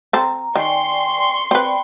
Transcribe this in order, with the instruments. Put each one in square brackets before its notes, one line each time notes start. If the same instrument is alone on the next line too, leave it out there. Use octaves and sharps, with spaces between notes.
[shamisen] C4 A4 [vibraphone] A#5
[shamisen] D#3 [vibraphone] D5 G5 G#5 [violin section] C6 C#6
[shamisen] C4 B4 [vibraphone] D5 G5 B5